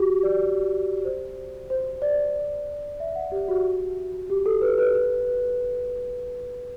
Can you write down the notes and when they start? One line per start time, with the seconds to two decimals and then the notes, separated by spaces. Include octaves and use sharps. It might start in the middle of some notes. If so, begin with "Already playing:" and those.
Already playing: F#4 G4
0.23 D5
1.05 C5
1.70 C5
2.02 D5
3.00 E5
3.15 F#5
3.32 G4
3.48 F#4
4.30 G4
4.46 A4
4.61 B4
4.78 B4
4.95 B4